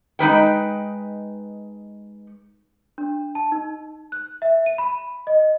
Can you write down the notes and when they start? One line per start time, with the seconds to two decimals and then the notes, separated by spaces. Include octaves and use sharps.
0.19 G#3 D#4 B4 G5
2.98 D4
3.35 A5
3.52 D#4
4.12 F#6
4.42 E5
4.66 D#7
4.78 B5
5.27 D#5